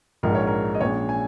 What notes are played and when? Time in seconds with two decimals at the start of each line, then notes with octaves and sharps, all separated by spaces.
0.23 A#1 G#2 G#3 A#4
0.35 C#5
0.47 A#4
0.74 D#5
0.81 A#1 A#2 G#3 C#4 C#5
1.09 G#5